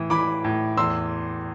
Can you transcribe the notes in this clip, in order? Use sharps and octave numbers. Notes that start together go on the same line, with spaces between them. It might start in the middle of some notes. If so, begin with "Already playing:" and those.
Already playing: A2 E3
E3 B5 D6
A2
E2 C6 E6